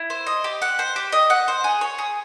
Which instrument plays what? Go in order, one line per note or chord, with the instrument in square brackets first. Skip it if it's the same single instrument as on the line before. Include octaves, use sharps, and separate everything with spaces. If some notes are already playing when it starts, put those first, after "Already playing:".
Already playing: [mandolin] E4
C5
D#5
G4
F#5
C5
G4
D#5
F#5
C5
G#4
C#5
G#4